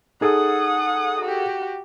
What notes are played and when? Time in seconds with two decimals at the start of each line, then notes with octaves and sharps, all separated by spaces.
0.21 D#4 G#4 A4 F#5 D#6
1.21 F#4 G4